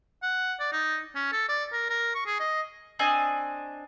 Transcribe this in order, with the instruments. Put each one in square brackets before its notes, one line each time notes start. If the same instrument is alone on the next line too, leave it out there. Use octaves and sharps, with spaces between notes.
[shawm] F#5
D5
D#4
C#4
A4
D5
A#4
A#4
C#6
G#4
D#5
[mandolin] C4 D4 D#5 G#5